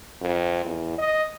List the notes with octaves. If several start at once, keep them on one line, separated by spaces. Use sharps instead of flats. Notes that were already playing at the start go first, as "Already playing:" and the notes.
F2
E2
D#5